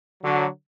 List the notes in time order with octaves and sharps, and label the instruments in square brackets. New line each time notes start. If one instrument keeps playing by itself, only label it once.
[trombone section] D3 F#3